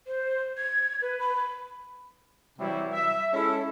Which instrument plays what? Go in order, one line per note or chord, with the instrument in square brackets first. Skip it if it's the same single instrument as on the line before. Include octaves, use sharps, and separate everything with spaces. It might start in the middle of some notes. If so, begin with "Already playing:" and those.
[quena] C5
G#6
B4
B5
[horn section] C3 E3 F#3 G3 E4
E5
G#3 C#4 E4 A4